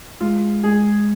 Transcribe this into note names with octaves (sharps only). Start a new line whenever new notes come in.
G#3 F4
G#3 G#4